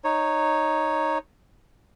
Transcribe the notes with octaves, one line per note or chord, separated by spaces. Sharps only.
D#4 C#5